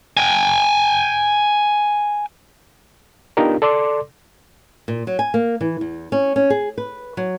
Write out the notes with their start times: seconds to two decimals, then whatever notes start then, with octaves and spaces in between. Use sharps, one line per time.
0.17 G5 G#5
3.37 B3 D4 D#4 F4 G4 A#4
3.62 A4 D5 C6 D6
4.88 A#2
5.07 F#3
5.19 G#5
5.34 A#3
5.61 E3
5.81 E2
6.12 C#4
6.36 C#4
6.50 G#4
6.78 B4
7.17 F#3